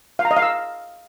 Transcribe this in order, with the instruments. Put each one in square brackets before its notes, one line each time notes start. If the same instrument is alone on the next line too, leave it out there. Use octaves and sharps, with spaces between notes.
[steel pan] F5
A#5
D#5
F5
E6